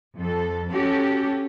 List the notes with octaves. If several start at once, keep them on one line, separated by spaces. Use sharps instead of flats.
F2 A4
C#4 F#4 G4 A4